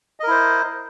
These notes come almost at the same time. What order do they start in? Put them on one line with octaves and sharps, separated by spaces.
D#5 A#4 E4 C5